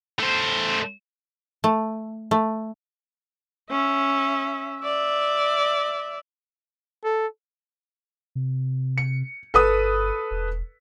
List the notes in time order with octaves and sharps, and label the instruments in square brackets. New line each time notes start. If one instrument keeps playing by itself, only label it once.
[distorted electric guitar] A3 C5
[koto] A3
A3
[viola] C#4 E5
D5 E5
[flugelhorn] A4
[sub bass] C3
[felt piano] C#7
[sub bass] G1 [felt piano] A4 B4 D#6
[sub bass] E1